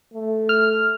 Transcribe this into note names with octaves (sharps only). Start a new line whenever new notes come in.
A3
F6